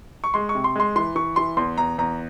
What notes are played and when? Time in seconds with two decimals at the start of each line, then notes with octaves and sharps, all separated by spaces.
0.24 C#6
0.34 G#3 C6
0.49 C#6
0.55 C3
0.64 C6
0.76 G#3 C6
0.96 E3 C6
1.16 E3 C#6
1.36 E3 C6
1.57 E2 C6
1.78 E2 A#5
1.98 E2 A#5